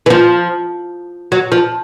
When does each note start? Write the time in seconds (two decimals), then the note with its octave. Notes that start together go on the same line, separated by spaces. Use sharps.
0.06 E3
0.10 F3
1.32 F#3
1.52 F3